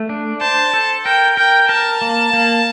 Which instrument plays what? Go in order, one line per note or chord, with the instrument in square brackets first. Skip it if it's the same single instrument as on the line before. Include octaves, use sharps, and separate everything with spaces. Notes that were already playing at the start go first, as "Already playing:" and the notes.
Already playing: [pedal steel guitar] A3
D4
[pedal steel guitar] C5 [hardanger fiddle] A5
[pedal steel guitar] A4
[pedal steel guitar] A#4 [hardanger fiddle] G5
[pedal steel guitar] A#4 [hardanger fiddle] G5
[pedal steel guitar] A#4 [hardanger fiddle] A5
[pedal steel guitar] A#3
A#3